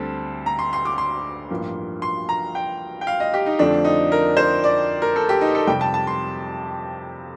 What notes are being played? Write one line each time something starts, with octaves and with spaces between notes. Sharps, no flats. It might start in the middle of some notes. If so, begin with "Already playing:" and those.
Already playing: D2 D3 G3 C4 A5
A#5
C6
C6
D6
C6
A1 G2 F3 A#3
C6
A#5
G5
G5
F5
D#5
G4
D#4
F2 D3 F3 A3 C4 D4
D#4
A#4
C5
D5
A#4
A4
G4
D#4
A4
F2 C3 G3 G5
A5
A5
C6